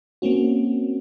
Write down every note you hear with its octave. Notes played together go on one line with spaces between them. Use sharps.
A#3 C4 C#4 F#4